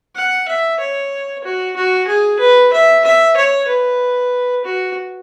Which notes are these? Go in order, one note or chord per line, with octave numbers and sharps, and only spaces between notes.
F#5
E5
C#5
F#4
F#4
G#4
B4
E5
E5
C#5
B4
F#4